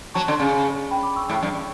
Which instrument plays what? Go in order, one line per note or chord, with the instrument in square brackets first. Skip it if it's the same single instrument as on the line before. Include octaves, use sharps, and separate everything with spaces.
[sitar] F#3 [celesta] A5 C#6
[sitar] D3
C#3
[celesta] G5 B5
B5 D6
C#6 E6
[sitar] A2
G2